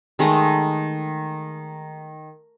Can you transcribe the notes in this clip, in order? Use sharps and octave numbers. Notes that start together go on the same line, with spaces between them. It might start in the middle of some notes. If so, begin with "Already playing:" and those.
D#3 G#3 A3 D#4